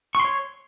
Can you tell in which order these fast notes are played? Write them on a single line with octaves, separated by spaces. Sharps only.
C#6 C6 C#5